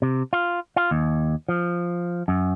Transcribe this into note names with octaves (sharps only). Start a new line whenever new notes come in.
C3
F4
F4
D#2
F3
F#2